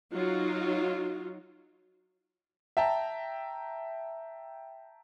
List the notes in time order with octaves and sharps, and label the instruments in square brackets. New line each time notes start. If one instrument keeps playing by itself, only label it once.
[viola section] F#3 D#4 F4 F#4
[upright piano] E5 G5 A5 A#5